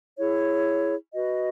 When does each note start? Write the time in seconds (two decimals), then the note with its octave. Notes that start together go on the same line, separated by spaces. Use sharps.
0.19 E4 G#4 C#5
1.14 F#4 B4 D#5